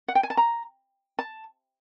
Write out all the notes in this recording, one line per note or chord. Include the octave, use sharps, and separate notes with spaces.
F#5
G5
G#5
A5
A#5
A5